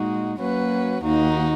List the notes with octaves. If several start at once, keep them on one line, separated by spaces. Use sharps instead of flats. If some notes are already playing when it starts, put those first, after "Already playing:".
Already playing: A#2 G#3 D#4 F#4
F#3 A#3 C#4 F#4 B4
D#2 D#3 A#3 D#4 F#4